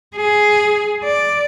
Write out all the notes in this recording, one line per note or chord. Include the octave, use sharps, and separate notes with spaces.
G#4
D5